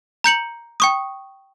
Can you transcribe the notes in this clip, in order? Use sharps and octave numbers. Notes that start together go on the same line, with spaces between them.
A#5 G6 C#7 F#7
G5 C#6 D#6